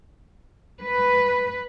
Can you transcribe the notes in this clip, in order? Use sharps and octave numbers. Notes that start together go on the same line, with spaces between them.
B4